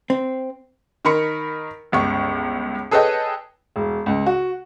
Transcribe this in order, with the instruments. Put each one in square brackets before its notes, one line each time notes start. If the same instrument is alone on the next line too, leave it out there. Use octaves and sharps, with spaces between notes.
[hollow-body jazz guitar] C4
[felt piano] D#3 A#4 B5 C#7
G1 C#2 C#6
G#4 A4 B4 C#5 D#5 G5
[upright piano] E1
C#2
F#4